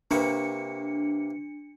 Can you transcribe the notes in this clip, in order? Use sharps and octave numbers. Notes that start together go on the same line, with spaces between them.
C3 A#3 D4 B4 C#7